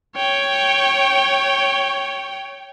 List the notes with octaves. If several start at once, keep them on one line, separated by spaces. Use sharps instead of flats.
C#5 G5